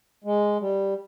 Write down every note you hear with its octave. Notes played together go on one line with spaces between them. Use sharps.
G#3
G3